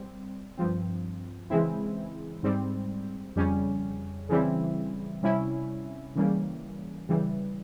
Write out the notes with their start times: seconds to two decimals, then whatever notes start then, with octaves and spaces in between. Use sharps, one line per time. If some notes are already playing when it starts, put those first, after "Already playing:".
Already playing: G3 C4
0.57 G2 F3 C4
1.50 C#3 E3 G#3 C4 E4
2.43 G#2 G3 C4
3.36 F2 C#3 G3 C#4
4.29 C#3 E3 G3 C4 E4
5.23 C3 G3 C#4 E4
6.16 C#3 E3 G3 A#3 C#4
7.09 C#3 E3 G3